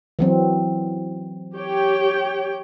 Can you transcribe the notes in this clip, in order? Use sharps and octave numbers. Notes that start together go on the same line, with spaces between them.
E3 F#3 C4
G4 C#5 G5